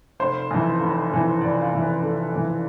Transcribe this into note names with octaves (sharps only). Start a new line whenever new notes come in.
F1 C5
F2 E3
F1
F2 E3
F1 D5
F5
F2 E3
B4
F1 A4
F2 E3